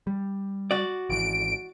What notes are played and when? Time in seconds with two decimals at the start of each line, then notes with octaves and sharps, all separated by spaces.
0.07 G3
0.71 F#4 D5
1.10 G#1 E3 D7